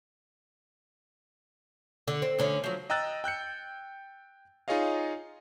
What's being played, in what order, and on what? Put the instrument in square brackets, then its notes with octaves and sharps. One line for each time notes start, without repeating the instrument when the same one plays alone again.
[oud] D3
C4
D2 D3 C#4
F3 F#3
[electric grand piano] D#5 G5 A#5 E6 F#6 A6
G5 F#6 G6 C#7
D#4 F4 G#4 C#5 D#5 F5